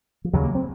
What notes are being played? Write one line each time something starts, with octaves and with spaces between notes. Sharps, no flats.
F3
D#2 C#3 F#3
A#3
C4